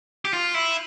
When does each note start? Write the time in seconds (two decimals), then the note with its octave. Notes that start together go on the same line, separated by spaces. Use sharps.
0.25 G4
0.33 F4
0.54 E4